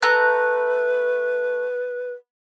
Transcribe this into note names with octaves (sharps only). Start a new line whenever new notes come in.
A3 B4 A#5 F#6